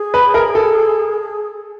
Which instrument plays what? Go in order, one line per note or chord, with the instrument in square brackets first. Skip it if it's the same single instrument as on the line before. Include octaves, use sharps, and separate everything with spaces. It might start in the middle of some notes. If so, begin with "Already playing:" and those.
Already playing: [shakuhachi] G#4
[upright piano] B4
A#4
A4